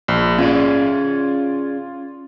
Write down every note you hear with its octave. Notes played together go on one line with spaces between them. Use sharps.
A#1
C#4 F4 G#4 D5